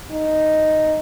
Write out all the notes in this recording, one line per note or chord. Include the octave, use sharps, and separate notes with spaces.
D#4